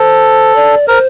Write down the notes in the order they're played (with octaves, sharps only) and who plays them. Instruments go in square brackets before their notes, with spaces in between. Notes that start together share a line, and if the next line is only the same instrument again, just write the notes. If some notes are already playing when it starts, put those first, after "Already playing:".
Already playing: [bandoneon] A4 [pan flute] C5
[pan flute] D5
[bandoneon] A#4 [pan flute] C5